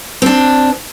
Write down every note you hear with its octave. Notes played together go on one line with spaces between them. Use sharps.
C4 D4